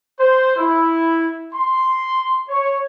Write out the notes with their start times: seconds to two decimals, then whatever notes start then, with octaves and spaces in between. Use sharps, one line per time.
0.19 C5
0.57 E4
1.54 C6
2.49 C#5